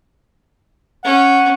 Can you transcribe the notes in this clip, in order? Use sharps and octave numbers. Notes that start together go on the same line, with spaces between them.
C#4 F#5